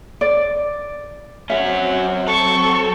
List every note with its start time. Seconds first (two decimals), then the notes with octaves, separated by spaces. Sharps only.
0.21 D5
1.50 F#3 C4 C#4 F#4 E5
2.28 A4 C#6